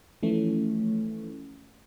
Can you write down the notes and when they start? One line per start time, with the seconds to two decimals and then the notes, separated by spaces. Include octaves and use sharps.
0.23 E3 F3 A3 C#4